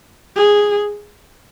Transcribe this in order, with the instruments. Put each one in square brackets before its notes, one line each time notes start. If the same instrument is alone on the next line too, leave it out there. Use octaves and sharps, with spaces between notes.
[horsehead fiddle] G#4